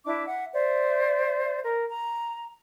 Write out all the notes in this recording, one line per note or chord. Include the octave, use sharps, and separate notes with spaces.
D4 E4 E5 D6
E5 F#5
C5 D5 E5
A#4
A#5